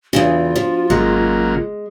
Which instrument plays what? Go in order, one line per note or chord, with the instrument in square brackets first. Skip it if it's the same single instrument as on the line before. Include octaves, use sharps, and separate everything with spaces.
[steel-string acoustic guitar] E2 C#3 E3 [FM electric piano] D4 F#4 [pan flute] F4
[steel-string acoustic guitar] F3
[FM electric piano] G#1 [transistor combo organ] C#3 F#3 A#3 [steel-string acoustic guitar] G#3